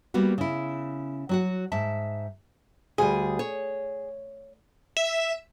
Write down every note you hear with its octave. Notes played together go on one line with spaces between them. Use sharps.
G3 A#3 B3 F#4
C#3 E4
F#3 F#4 F#5
G#2 E5 A5
D2 G3 G#4
C#5
E5